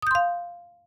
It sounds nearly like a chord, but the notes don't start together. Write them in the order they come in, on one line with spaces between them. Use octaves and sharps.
D#6 G6 C6 F5